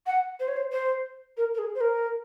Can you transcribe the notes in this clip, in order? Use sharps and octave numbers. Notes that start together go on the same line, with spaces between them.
F#5
C5
C#5
C5
C5
A#4
A#4
G#4
C5
A#4